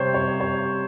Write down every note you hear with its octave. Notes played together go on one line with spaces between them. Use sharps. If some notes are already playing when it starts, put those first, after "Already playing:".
Already playing: C3 G3 C5 C#5
C#5
C#5